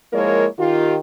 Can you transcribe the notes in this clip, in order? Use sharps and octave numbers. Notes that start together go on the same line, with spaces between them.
F3 G#3 A#3 E4 A#4 C#5
D#3 F4 G4